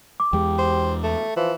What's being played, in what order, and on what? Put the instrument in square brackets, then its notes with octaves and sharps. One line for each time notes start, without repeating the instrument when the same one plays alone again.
[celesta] D6
[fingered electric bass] E2 G#3 [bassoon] G4
[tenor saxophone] C5
A3
[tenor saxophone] E3 [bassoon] F3